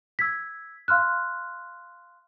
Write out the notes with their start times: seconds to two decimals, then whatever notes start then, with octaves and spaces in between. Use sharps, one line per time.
0.19 E6 G#6 B6
0.88 F5 C6 F6 F#6